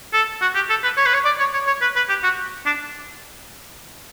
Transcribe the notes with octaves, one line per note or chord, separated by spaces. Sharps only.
A4
F#4
G4
A4
B4
C#5
B4
C#5
D5
C#5
C#5
C#5
B4
B4
G4
F#4
D4